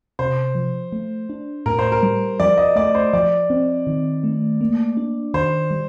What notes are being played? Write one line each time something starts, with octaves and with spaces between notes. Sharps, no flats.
C3 C5
F3
A3
D4
A2 A#4
C5
A#4
G3
F3 D5
D#5
A3 D5
C5
F3 D5
C4
D#3
A3
A#3
D4
D#3 C5
G3